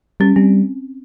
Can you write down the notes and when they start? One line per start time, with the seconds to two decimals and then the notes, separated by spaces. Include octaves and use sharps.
0.20 G3 C#4
0.36 G3 C4